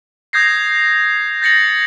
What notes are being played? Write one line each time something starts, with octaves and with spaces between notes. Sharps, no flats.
D#6 G6 G#6 A#6 C7
G6 A6 A#6 C#7 F#7